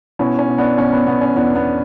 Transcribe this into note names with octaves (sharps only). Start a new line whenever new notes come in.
B2 C#4 E4
C#4
B2
B3 D4
B2 C#4
B3
B2 B3
C#4
E2 B3 D4
B3